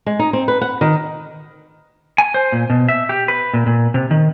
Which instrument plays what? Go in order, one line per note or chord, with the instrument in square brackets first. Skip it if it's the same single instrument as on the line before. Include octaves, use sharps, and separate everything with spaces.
[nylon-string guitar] G#3
D#4
C4
B4
F#5
D#3
[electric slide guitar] G#5
C5
A#2
B2
E5
G4
B4
A#2
A#2
C3
D#3